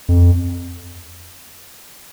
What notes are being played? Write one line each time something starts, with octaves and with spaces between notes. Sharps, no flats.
F2